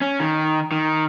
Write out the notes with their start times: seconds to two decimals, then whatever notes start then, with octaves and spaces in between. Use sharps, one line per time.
0.01 C#4
0.20 D#3
0.72 D#3